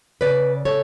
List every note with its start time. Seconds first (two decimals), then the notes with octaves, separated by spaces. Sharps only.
0.21 C#3 B4 D5
0.65 C#3 A4 C#5